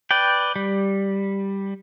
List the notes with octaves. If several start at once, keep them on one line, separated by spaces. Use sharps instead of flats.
B4 D5 G5
G3